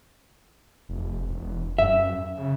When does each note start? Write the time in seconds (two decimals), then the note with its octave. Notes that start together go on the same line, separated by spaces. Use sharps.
0.89 F1
1.30 E1
1.79 F#2 E5
2.37 C#3